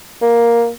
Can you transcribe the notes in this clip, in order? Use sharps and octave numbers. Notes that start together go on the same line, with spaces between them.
A#3